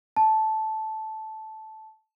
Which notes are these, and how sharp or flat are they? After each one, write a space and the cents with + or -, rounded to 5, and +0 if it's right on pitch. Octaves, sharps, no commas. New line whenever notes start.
A5 -10